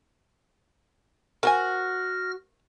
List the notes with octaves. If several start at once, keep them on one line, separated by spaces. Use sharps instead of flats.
F#4 A#4 C5 G#5 F6 A#6